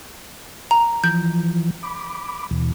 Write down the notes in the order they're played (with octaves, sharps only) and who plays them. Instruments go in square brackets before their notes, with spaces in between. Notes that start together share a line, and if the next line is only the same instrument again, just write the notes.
[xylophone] A#5
[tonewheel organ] E3 F3 [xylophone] G6
[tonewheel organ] B5 D6
D#2 B2 E3